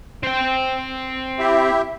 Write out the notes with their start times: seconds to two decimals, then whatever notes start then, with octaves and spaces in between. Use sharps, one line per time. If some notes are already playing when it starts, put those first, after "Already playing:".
0.23 C4 G5
1.39 E4 G4 E5